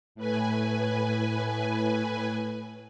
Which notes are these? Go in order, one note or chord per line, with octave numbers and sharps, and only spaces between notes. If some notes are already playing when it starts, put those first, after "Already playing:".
A2 B4 G#5